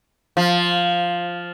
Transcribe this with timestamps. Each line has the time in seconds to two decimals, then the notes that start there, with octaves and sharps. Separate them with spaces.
0.37 F3